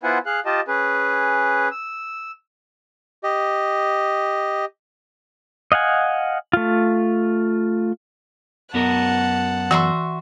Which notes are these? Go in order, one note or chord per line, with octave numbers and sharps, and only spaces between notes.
B3 E4 F4 C5 F#5 G#5
G#4 F5 F#6
F4 G4 D#5 A5
C#4 G#4 B4
E6
G4 D#5
D#5 F5 F#5 G#5
A3 F4
F#2 B3 A#4 F#5 A5
E3 F#4 E5 C6